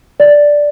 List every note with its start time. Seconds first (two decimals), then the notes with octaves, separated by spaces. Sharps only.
0.20 D5